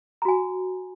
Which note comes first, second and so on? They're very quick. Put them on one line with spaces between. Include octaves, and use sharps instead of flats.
A#5 F#4 G#5